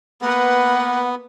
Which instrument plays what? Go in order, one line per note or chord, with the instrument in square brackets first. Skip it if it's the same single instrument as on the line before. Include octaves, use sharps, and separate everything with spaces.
[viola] A#3 B4 [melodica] B3 [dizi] F#5